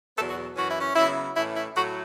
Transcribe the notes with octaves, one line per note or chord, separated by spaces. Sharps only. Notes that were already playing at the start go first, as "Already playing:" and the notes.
E2 B2 F#3 B3 A4
F#4
F#2 E3 C#4 F#4
E4
C#4
C#3 F#3 B3 E4
A2 E3 C#4 E4
E4
A2 F#3 A3 F#4